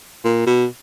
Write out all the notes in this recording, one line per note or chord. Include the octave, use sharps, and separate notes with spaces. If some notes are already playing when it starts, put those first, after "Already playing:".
A#2
B2